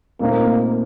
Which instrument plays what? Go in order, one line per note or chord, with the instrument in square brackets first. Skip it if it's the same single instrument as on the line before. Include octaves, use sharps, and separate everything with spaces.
[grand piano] A#2 A3 C4 D#4 [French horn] A#3